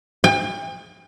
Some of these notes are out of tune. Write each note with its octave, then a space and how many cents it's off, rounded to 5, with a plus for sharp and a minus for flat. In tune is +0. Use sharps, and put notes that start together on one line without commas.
G5 +40